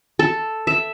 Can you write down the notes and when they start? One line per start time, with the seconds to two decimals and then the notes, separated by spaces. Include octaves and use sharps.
0.19 A4
0.67 E5